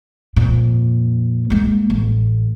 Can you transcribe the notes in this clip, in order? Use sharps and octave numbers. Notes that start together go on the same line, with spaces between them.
F2 A#2
G#3 A#3
A1